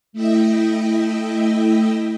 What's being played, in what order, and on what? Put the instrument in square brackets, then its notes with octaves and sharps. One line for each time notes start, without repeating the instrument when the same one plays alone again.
[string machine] A3 E4 D#5 E5 G5